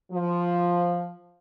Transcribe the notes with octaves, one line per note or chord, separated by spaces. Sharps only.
F3